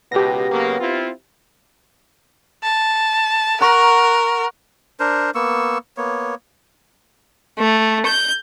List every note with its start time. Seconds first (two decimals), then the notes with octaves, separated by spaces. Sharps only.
0.12 C#2 B2 B3 G4 A#6
0.51 C#3 F#3 A#3
0.80 C4 E4 F4
2.63 A5
3.61 A#4 F#5 A#5 C#6
5.00 D4 A#4 C5
5.35 A#3 B3 C#6 E6
5.97 A#3 B3 C#5
7.59 A3
8.06 G6